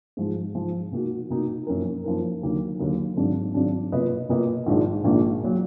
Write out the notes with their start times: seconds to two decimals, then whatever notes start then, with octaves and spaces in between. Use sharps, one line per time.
0.17 G#2 F3 G#3
0.54 G#2 F3 G#3
0.92 B2 A#3 D#4 F#4
1.30 B2 A#3 D#4 F#4
1.67 F#2 F3 A#3 D#4 A#4
2.04 F#2 F3 A#3 D#4 A#4
2.42 D#2 D3 F#3 A#3 D#4
2.79 D#2 D3 F#3 A#3 D#4
3.17 G#1 G#2 F#3 D4
3.54 G#1 G#2 F#3 D4
3.92 B2 A#3 F4 B4 D#5
4.29 B2 A#3 F4 B4 D#5
4.66 A#1 G#2 D#3 A#3 D4
5.04 A#1 G#2 D#3 A#3 D4
5.43 A#2 F#3